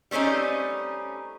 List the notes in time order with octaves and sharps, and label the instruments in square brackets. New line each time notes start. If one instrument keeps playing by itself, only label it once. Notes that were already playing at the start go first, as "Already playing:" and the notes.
[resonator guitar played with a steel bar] G3 A3 C4 C#4 D#4